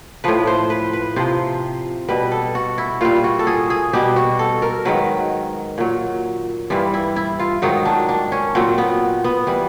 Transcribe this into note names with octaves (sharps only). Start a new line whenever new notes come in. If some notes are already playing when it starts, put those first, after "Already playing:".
A2 F3 B4
C5
B4
B4
C3 F3 C5
B2 G3 B4
A4
F#4
E4
A#2 G3 F4
F#4
A4
G#4
G#4
B2 G3 G4
F#4
A4
A#4
G#2 D#3 F#3 B4
A#2 F#3
G2 E3 G3 F4
E4
E4
F4
G#2 D#3 F#3 D#4
D4
D4
C#4
A#2 F#3 C4
B3
B3
E3 G3